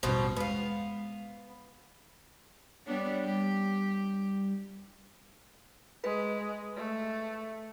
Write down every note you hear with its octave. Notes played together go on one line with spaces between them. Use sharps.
A1 E2 G2 B2 F3 C4
G#3 B3 F5
G3 B3 D4 C#5
G3 G4
G#3 B4
A3